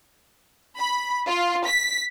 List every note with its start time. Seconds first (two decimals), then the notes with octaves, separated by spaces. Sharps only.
0.78 B5
1.28 F4
1.67 B6